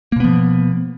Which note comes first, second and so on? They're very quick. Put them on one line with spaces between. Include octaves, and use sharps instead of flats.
A#3 B2 B3 F3